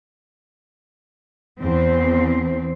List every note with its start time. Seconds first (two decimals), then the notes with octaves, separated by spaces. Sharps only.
1.60 E2 C4